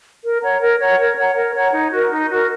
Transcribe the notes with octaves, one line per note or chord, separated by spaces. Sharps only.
A#4
C#5 F#5 A#5
A#4
C#5 F#5 A#5
A#4
C#5 F#5 A#5
A#4
C#5 F#5 A#5
D#4
F#4 A#4
D#4
F#4 A#4